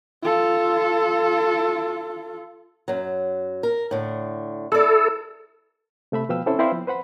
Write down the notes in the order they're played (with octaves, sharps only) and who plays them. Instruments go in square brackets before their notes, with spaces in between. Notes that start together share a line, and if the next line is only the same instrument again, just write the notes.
[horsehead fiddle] F4 A4
[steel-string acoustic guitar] F#2 F#3
A#4
A2 D3
[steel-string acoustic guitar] E4 D5 [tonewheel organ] A4
[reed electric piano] C3 A3 E5 B5
B2 F3 B4 F5 G5 E6
C4 C#4 E4 A4 C5
C4 E4 B4 C5 D5 F5
F3 B3
B4 C5 F#5 B5